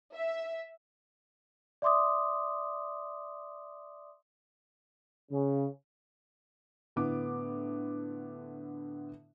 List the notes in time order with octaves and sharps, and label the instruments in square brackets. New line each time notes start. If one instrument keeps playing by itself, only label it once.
[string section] E5
[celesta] D5 E5 C6 D6 D#6
[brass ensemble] C#3
[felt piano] A2 D3 B3 D6